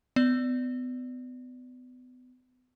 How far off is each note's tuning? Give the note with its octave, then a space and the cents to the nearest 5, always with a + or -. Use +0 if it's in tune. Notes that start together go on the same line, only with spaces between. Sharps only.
B3 +35 D5 +0